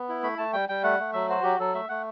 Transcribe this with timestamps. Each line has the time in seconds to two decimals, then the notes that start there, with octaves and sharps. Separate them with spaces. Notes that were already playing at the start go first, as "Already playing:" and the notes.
Already playing: B3
0.09 E4
0.23 A3 B5
0.38 A3 A5
0.53 G3 G5
0.69 G3 G5
0.83 A3 F#5
0.99 A3
1.13 F#3 E5
1.29 F#4 C5
1.43 F#3 G4
1.60 F#3 A4
1.74 A3 E5
1.89 A3 F#5